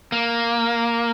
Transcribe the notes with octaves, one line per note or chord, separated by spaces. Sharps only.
A#3